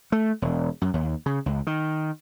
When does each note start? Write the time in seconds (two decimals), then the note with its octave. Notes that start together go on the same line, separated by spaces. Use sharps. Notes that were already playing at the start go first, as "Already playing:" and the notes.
0.12 A3
0.42 E1
0.82 F#2
0.94 D#2
1.26 C#3
1.46 C#2
1.67 D#3